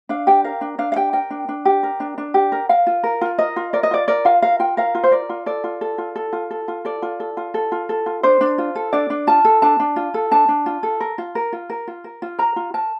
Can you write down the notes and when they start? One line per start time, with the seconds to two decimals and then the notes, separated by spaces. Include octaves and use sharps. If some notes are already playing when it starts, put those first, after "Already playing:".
0.09 D4 F5
0.27 G4 G5
0.44 A#4 F5
0.61 D4
0.78 D4 F5
0.92 F5
0.96 G4 G5
1.13 A#4 G5
1.30 D4
1.49 D4
1.65 G4
1.83 A#4
2.00 D4
2.18 D4
2.34 G4
2.52 A#4
2.69 A#4 F5
2.87 F4
3.03 A#4
3.21 F4
3.38 A#4 D#5
3.56 F4
3.73 A#4 D5
3.83 D#5
3.91 F4 D5
4.08 A#4 D5
4.25 F4 F5
4.42 A#4 F5
4.59 F4 G5
4.77 A#4 F5
4.95 F4
5.03 C5
5.11 A#4 D5
5.29 F4
5.46 A4 D5
5.64 F4
5.81 A4
5.98 F4
6.16 A4
6.33 F4
6.50 A4
6.68 F4
6.85 A4 D5
7.02 F4
7.20 A4
7.37 F4
7.54 A4
7.72 F4
7.89 A4
8.06 F4
8.23 D4 C5
8.41 D4
8.58 F4
8.75 A4
8.93 D4 D5
9.10 D4
9.27 F4 A5
9.45 A4
9.62 D4 A5
9.80 D4
9.96 F4
10.14 A4
10.31 D4 A5
10.48 D4
10.66 F4
10.83 A4
11.00 A#4
11.18 F4
11.35 A#4
11.53 F4
11.70 A#4
11.87 F4
12.04 A#4
12.22 F4
12.39 A#4 A#5
12.56 F4
12.74 A#4 A5